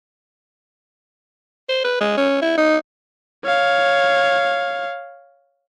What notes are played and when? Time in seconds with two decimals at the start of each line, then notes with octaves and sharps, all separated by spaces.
1.69 C5
1.84 B4
2.01 G#3
2.17 C#4
2.42 E4
2.58 D#4
3.45 C#5 F5